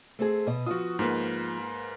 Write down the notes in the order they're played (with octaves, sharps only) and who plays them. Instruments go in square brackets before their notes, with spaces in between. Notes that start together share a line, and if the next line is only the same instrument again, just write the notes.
[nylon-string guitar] A3 C4 G#4
B2 D#5 E5
[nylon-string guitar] F3 B3 F4 [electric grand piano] F#4 D#6
[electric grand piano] G#2 A#3 B4